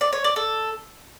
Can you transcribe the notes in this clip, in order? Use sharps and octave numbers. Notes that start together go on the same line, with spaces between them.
D5
C#5
D5
A4